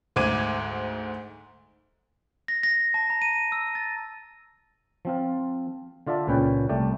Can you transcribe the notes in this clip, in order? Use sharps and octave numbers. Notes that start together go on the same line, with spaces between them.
D2 G#2 C5 D6 G#6 D#7
A#6
A#6
A5
A#5
D#7
E6
A6
F3 C4 F4
D3 F4 D5 E5 A5
C#2 A#2 C#4 B4 G5
C2 A3 D5 G5